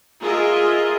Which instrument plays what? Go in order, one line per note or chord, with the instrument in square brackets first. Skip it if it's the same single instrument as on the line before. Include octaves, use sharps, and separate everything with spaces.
[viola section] F4 G#4 A#4 D#5 E5